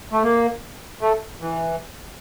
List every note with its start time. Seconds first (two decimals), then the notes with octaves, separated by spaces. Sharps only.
0.12 A3
0.23 A#3
1.01 A3
1.41 E3